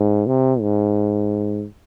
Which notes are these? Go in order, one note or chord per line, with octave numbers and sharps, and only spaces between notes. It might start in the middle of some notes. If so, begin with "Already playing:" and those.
Already playing: G#2
C3
G#2